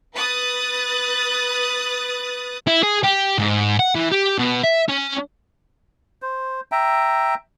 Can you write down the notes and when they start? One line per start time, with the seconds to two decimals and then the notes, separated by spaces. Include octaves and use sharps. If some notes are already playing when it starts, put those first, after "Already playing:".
0.14 B4 D#6 F#6 A6
2.67 E4
2.83 G#4
3.04 G4
3.39 G#2
3.80 F#5
3.95 E3
4.12 G4
4.39 B2
4.64 E5
4.89 C#4
6.22 C5
6.72 E5 G5 A#5